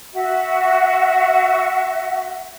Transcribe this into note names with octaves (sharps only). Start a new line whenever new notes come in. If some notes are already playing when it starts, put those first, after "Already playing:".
F#4 E5